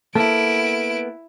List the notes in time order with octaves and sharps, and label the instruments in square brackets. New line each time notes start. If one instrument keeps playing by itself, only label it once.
[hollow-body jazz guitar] A#3 B3 A4 [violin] E4 D7